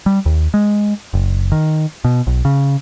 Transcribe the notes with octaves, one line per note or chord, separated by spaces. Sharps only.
G3
D#2
G#3
F#1
D#3
B2
B1
C#3